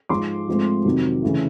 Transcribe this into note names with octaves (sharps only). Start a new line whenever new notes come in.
G#2 F3 G#3 C6 D6
G#2 F3 A3 C4
F2 C3 D#3 F#3
C#3 E3 A3